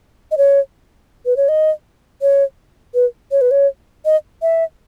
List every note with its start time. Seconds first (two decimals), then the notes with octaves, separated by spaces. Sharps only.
0.31 D#5
0.38 C#5
1.26 B4
1.37 C#5
1.49 D#5
2.22 C#5
2.94 B4
3.31 C#5
3.41 B4
3.51 C#5
4.05 D#5
4.42 E5